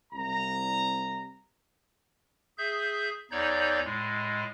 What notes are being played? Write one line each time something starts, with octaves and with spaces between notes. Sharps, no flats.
C2 A#5
G#4 E5 G6
E2 D#4 C#5 D5 G6
A2 G#3